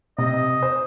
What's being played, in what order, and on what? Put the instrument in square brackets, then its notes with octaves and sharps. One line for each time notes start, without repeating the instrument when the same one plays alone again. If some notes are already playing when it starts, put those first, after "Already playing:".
[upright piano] C3 [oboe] D#5
[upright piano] C5